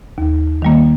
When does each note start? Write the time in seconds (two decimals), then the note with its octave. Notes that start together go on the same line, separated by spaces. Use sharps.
0.18 D#2
0.62 D#3 G3 A#3